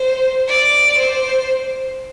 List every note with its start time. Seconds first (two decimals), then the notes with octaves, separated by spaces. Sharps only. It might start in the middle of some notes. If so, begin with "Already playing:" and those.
Already playing: C5
0.49 D5
0.98 C5